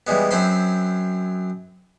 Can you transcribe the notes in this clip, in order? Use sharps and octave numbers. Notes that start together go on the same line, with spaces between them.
E3 G3 G#3 B3
F#2 F#3 C4 C5 B5 C6